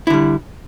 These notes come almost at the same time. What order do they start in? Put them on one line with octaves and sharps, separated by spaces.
E4 D3 G3